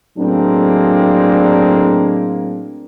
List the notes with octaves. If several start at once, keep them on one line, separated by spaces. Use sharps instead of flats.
A2 F#3 G#3 A#3 C4 D4